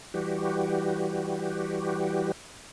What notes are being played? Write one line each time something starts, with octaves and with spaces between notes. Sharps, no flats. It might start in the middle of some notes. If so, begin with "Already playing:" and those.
E3 G3 F#4 G4